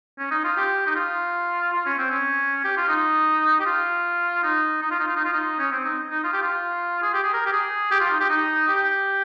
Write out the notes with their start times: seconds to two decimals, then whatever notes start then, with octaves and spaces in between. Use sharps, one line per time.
0.18 C#4
0.31 D#4
0.44 F4
0.57 G4
0.86 D#4
0.96 F4
1.73 F4
1.86 C#4
1.98 C4
2.11 C#4
2.64 G4
2.77 F4
2.89 D#4
3.60 G4
3.66 F4
4.43 D#4
4.82 D#4
4.91 F4
5.00 D#4
5.08 F4
5.16 D#4
5.24 F4
5.33 D#4
5.59 C#4
5.72 C4
5.85 D#4
6.11 D#4
6.24 F4
6.33 G4
6.42 F4
7.02 G#4
7.14 G4
7.24 G#4
7.33 A#4
7.46 G4
7.52 G#4
7.91 G4
8.00 F4
8.10 D#4
8.20 G4
8.30 D#4
8.68 G4